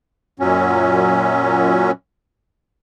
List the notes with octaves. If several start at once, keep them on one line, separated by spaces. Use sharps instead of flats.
F#2 A#2 F#3 C#4